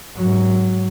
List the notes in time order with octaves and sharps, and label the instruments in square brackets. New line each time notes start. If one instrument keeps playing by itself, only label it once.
[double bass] G#2 F#3